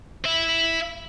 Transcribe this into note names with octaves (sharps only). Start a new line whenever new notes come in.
E4 E5